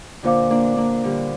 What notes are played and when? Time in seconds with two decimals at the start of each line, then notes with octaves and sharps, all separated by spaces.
0.23 A#2 D3 F4 C5 F5 D6
0.50 A#3 D4
0.77 A#3 D4
1.04 D3 G3